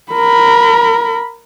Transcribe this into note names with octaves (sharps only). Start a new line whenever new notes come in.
A#4 B5